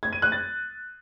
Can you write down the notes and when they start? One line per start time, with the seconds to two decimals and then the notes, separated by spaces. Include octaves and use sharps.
0.03 G#6
0.13 D#7
0.22 F#6
0.32 A6